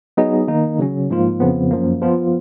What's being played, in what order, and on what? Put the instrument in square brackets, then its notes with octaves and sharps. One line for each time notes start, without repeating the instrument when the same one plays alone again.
[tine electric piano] F#3 B3 D#4 G#4 D#5
D#3 A#3 D#4
C#3 F#3 C#4
G#2 F3 A#3 F4
F2 C#3 F3 B3
F#2 F3 A#3
F3 B3 F4